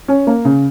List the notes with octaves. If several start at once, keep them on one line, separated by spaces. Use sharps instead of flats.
C#4
A#3
C#3